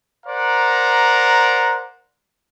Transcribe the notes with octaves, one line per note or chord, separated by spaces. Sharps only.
A#4 C5 D5 F#5 A#5